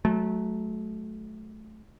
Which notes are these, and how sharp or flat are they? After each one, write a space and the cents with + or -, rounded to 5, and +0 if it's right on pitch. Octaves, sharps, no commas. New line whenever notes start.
F#3 +0 A3 -25